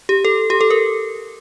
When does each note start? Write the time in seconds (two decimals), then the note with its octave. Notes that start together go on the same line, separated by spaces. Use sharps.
0.09 G4
0.25 A4
0.50 G4
0.61 A4
0.70 A#4